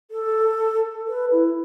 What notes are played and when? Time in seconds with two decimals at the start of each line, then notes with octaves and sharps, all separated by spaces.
0.11 A4
1.08 B4
1.32 E4